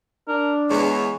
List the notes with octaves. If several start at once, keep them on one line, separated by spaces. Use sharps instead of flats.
D4 A#4
E2 G#3 G#4 C#5